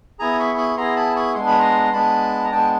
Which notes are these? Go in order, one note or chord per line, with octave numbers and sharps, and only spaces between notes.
B3 E4 G#4 G#5 A#5
B5 C#6
B5 C#6
B3 E4 G#4 A#5 C6
A5 B5
B5 C#6
G#3 B3 D4 C6
B5
A#5 C6
C6
G#3 B3 D4 A5 B5
A#5
G#3 B3 D4 G5 A5